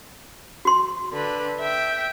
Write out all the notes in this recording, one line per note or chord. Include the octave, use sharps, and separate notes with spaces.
F#4 C6
D3 B4
E5 G5